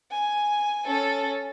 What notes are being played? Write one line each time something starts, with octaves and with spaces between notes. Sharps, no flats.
G#5
C#4 A4